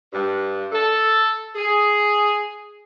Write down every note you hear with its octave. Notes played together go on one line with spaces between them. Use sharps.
G2
A4
G#4